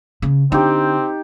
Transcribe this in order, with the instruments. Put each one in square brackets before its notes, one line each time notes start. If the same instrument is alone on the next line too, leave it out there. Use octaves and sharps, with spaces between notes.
[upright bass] C#3
[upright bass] D3 [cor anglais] C4 [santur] D#4 G4